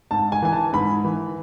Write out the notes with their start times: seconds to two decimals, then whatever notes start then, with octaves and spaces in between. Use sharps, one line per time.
0.11 G#2 A5
0.32 G#5
0.42 E3 G#5
0.53 A5
0.73 G#2 B5
1.04 E3